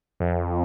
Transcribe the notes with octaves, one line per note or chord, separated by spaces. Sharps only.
F2